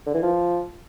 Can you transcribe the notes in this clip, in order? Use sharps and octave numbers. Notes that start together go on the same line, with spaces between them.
D3
E3
F3